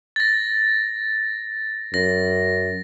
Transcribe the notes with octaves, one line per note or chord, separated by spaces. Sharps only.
A6 A#6
F#2 A#6